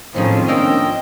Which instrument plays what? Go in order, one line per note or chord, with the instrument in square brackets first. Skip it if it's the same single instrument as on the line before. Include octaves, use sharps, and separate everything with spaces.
[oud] D#2 A2 G#4 [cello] D#3 F3 [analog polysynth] C4 C#4
[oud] A#3 D4 F4 [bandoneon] D#5 E6 [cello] G5